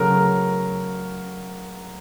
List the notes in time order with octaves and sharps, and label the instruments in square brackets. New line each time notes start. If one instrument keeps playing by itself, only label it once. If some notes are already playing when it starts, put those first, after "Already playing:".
Already playing: [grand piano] C#3 F#3 A3 A#4